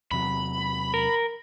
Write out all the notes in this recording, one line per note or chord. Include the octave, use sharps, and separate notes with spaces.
E2 C3 F#3 B5
A#4